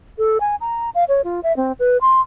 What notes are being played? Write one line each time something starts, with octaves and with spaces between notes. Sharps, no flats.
A4
G#5
A#5
F5
C#5
F4
E5
C4
B4
C6